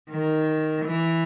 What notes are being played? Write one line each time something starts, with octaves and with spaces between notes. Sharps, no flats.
D#3
E3